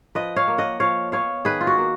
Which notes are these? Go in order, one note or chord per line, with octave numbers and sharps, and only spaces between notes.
F3 B4 D#5
C#5 F5
A#3
D#5 F#5
F3 C#5 F5
B3 C#5 F5
D#3 G#4 B4
F4
F#4
A#3